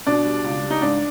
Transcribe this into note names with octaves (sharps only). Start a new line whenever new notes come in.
B2 D4
G3
C#2
G3
D#4
G#2 D4